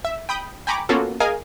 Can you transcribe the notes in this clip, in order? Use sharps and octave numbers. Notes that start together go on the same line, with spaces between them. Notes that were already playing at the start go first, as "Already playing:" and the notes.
E5
G5 B5 D#6 G6
G5 G#5 A#5 B5 C#6 D6
A#3 B3 C#4 F4 F#4 A4
G#4 A#4 D#5 F5 G#5